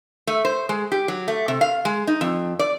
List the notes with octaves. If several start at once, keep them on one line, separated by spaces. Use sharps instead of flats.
A3
C5
G#3
G4
F#3
A3
C3
F5
G#3
D#4
F2
D5